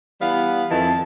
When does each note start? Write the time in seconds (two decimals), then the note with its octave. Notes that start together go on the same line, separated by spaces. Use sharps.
0.21 E3 G3 B3 F5
0.71 F2 D#3 E3 A5